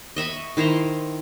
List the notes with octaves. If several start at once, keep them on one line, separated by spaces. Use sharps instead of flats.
D#5 E5 B5 C#6
D#3 E4 C5 A#5